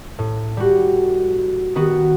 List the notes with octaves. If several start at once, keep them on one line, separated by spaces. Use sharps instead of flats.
A2
G3 F#4
D#3 B3 F#4